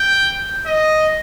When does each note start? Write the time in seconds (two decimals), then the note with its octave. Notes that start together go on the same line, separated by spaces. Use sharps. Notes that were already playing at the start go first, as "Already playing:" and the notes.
Already playing: G5
0.66 D#5